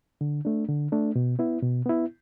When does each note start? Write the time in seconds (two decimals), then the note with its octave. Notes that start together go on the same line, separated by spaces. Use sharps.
0.21 D3
0.45 A3 D4
0.68 D3
0.92 A3 D4
1.16 B2
1.39 B3 E4
1.62 B2
1.86 B3 E4